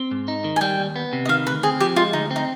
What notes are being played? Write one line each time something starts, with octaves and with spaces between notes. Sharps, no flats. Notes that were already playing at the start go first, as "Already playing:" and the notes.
Already playing: C4
G#2
D#4
D#3
G#5
G3 G5
D#2
B3
C3
D#5
D#3 F5
D2 B4
C4 G#4
F3 G4
G#3 F4
D2 D#4
C4
D#4